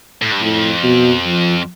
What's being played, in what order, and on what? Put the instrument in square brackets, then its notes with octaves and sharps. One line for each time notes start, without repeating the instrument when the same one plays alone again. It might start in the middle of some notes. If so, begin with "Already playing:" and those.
[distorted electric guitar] A2
G2
[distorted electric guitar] F2 [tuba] A2
[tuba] B2
F3